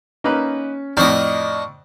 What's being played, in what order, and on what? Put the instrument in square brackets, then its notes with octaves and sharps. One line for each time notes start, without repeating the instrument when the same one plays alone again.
[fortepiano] A#3 D#4 B4 [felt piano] C#4
[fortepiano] F2 A2 [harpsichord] D4 D#5 [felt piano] C#6 F6